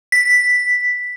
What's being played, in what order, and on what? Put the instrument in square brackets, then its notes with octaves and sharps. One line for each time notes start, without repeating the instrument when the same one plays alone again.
[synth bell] B6